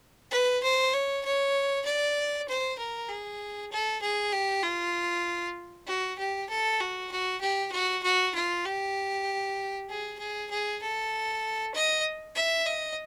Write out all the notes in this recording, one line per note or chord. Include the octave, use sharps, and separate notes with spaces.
B4
C5
C#5
C#5
D5
C5
A#4
G#4
A4
G#4
G4
F4
F#4
G4
A4
F#4
F#4
G4
F#4
F#4
F4
G4
G#4
G#4
G#4
A4
D#5
E5
D#5